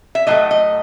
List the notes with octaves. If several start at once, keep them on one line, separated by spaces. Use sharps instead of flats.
E5
A2 F#3 A3 D#5
D#5